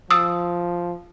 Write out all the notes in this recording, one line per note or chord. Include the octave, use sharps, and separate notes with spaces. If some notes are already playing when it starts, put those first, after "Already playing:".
F3 D#6 E6